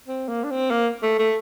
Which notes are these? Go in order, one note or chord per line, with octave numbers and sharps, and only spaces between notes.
C4
A#3
D4
C4
A#3
A3
A3